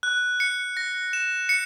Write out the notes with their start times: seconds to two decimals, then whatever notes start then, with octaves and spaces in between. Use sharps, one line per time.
0.03 F#6
0.40 C#7
0.77 A#6
1.13 E7
1.49 C#7